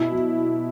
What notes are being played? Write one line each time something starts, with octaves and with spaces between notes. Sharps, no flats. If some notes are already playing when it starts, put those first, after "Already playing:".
Already playing: B2 E4
F#3